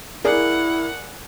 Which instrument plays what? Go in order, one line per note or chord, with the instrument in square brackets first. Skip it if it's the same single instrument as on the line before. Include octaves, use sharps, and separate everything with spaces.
[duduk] E4 [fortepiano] G#4 D5 [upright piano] A#4 [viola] F#5